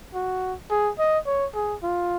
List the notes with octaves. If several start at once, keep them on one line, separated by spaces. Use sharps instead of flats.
F#4
G#4
D#5
C#5
G#4
F4